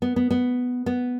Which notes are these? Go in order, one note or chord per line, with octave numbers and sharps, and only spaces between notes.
B3
B3
B3
B3